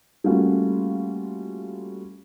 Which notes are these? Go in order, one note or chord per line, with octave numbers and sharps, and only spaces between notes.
G3 A3 A#3 C#4 F4 F#4